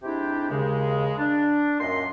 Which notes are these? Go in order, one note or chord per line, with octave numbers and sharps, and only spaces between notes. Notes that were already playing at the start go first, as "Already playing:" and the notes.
G#2 C3 D4 E4 G4
D#2 C#3 G#3
D4
F#2 A#2 D#5 C6